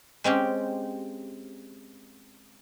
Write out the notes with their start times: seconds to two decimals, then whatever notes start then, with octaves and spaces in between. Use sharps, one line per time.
0.24 G#3 C4 C#4 G4